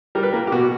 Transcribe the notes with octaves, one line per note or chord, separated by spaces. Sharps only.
G3 A#4
B4
A#3 A#4
G4
B2 F#4